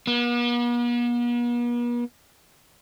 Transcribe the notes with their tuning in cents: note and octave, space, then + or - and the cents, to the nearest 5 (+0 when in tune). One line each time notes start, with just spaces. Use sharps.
B3 -45